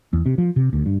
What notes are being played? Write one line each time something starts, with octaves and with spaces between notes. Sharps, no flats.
E2
C3
F3
C3
D2
G2